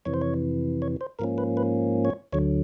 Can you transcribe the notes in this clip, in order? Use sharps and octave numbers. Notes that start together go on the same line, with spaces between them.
F2 C3 E3 C#5
C5
C#5
C#5
C5
G#2 F3 A#3 C#4 A#4
B4
B4
C#5
D2 D3 F#3 C#5